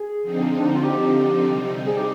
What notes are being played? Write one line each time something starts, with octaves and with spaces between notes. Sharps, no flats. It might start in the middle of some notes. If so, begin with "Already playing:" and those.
Already playing: G#4
D3 F3 C4 D#4
D4
D#4
F4
G4
C3 G3 C4 D#4
G#4
G4